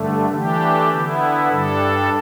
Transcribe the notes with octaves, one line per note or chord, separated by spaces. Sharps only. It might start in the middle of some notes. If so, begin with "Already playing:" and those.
Already playing: G2 D3 A3
E3 A3 D4 G4
D3 B3 E4
G2 G3 D4 A4